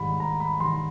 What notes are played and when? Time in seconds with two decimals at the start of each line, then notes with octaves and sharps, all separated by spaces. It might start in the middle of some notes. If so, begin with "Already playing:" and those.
Already playing: G#2 D#3 G3 B5
0.19 G#2 A#5
0.40 B5
0.60 D#3 G3 C6